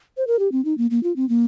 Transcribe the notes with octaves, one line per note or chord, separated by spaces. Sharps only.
C5
A#4
G4
C4
D#4
A#3
A#3
F4
C4
A#3